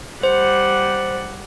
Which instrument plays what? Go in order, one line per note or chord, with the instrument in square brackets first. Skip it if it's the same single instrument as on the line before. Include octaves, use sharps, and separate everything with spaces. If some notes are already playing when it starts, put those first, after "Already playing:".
[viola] G3 F#5 [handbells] C5